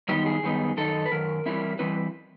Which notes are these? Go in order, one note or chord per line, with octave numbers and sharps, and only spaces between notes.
F#2 D#3 G3 B3 D#4 G4
G#4
F#2 D#3 G3 B3 D#4
F#2 D#3 D#4 A4
B4
F#2 D#3 A#4
E3 G3 C4 E4
E3 G3 C4 E4 B4